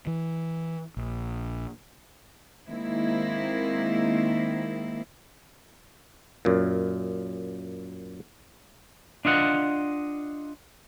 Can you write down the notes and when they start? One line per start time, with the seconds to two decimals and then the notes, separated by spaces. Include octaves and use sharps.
0.07 E3
0.97 A#1
2.68 D#3 G#3 A#3 C4 E4
6.45 F#2 A#2
9.25 D4 F4 D#5 F#5